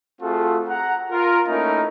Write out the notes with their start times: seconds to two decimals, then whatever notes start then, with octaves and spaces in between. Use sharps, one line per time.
0.22 A3 C4 F4 F#4 G#4 A4
0.67 F#5 A#5
1.11 F4 A#4
1.48 A3 A#3 C#4 D#4 E4 A#4